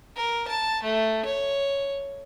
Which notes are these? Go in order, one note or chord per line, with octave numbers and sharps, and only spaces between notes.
A#4
A5
A3
C#5